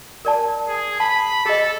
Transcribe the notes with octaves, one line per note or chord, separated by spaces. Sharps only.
A#4 D5 A5
G#4
A5 B5
G#4 A4 D#5